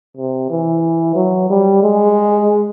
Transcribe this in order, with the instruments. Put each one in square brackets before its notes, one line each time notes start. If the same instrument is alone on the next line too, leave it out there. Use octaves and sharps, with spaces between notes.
[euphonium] C3
E3
F#3
G3
G#3